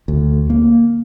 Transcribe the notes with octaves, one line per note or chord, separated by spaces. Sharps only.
D2
A#3